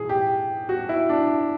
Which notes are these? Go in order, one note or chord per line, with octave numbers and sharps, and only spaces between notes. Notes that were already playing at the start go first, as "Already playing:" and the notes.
Already playing: B1 A2 E3 G#4
G4
F#4
E4
D4